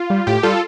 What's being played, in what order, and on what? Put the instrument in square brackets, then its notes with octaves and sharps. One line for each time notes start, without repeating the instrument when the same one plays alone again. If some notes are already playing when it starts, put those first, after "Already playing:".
Already playing: [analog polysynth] F4
G3
A2 G4
G3 F4 A4